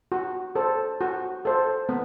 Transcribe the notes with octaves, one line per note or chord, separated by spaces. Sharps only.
F#4
A4 C5
F#4
A4 C5
B3